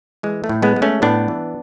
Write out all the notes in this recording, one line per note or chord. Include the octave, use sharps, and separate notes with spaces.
E3 G#3
A3
A2
G#3 B3
G#3
A3 C#4
A2 B3 D4
E3